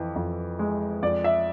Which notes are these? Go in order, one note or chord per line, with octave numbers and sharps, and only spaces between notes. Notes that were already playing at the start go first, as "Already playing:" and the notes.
Already playing: F2 E3
F2
G#3
F2 D5
E5